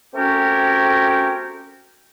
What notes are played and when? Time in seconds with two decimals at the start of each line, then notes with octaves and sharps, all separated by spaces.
0.13 A3 C4 C#4 F#4 G4 A#4